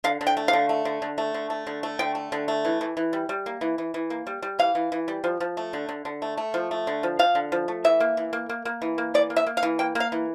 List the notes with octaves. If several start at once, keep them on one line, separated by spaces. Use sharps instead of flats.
D3 F5
D3
G5
A3
F5
D3
A3
D3
D3
A3
D3
A3
D3
A3
D3 G5
A3
D3
A3
E3
E3
E3
G3
G3
A#3
E3
E3
E3
A#3
G3
G3
E3 F5
E3
E3
G3
F3
F3
A3
D3
D3
D3
A3
A3
F3
A3
D3
F3
F3 F5
D3
F3
A3
E3 E5
A#3
E3
A#3
A#3
A#3
E3
A#3
E3 D5
A#3
E5
A#3
F5
E3
A#3 G5
A#3
F5
E3